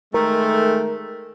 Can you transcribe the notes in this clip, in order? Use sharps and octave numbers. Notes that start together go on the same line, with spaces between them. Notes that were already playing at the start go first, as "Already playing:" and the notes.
D#3 G#3 A3 A#4